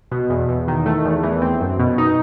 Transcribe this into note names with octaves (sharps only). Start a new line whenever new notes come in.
B2
E2
E2
D#3
A3
E2
E3
C4
F#2
B2
D#4